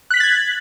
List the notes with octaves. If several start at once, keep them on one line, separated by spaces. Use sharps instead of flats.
F#6 G#6 A6 B6 F#7